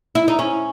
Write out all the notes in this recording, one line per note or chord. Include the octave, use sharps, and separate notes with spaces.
E4
D#4
C#4